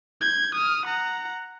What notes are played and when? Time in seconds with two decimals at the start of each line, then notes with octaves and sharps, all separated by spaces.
0.21 G6 G#6
0.55 D#6 F6
0.86 F#5 A#5